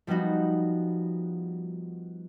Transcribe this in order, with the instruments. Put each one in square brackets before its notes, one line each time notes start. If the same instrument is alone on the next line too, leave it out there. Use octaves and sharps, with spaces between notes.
[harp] F3 G3 B3 D#4 F#4